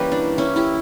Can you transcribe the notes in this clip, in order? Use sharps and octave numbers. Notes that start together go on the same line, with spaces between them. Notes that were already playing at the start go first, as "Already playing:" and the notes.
Already playing: E3 G3 A#3 C#4 G4 B4
D4
C#4 E4
E4 G4